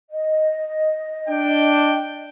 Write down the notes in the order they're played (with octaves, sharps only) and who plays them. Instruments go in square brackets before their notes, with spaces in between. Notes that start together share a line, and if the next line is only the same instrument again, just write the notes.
[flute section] D#5
[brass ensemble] D4 G5